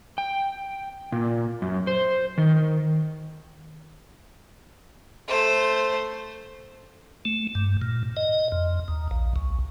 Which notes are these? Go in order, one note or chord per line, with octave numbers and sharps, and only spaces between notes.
G5
A#2
F#2
C5
D#3
A3 C5
A3
G2
A#2
D#5
F2
D#2
A#1
C#2